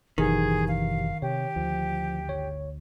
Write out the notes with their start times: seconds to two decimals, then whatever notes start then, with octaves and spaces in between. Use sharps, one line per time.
0.18 F#1 B2 D#3 E3 G4 G#4
0.68 F5
1.22 C3 G4 C#5
1.56 D2 F3
2.27 G1 C#5